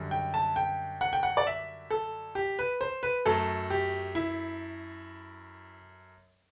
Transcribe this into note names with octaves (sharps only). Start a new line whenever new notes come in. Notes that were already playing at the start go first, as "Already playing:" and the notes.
Already playing: F#2 D3 G3
G5
A5
G5
F#5
G5
F#5
D5
E5
A4
G4
B4
C5
B4
F#2 F#3 A3 A4
G4
E4